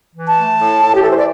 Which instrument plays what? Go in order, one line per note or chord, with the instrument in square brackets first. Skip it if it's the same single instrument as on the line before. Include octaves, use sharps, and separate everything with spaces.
[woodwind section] E3
A5
A3
A2
A2
G4
E3 A4
C5
D5